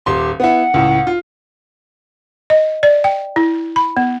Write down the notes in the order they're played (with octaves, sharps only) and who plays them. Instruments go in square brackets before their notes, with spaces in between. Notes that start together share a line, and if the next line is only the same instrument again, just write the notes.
[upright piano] D#1 C6 [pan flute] G4
[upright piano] B3 E4 [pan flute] F#5
[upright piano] C#2 A2
F4
[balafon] D#5
D5
G5
E4
B5
B3